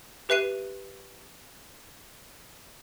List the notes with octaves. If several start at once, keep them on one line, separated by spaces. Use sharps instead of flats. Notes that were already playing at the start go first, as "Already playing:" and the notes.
G4 B4 E5 F#6 C7 D#7